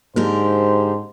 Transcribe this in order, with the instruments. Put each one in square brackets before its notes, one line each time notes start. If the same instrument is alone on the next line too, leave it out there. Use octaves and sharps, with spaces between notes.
[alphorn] G#2 [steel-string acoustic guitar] D3 G4 A#4 [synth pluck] A#3 [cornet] C5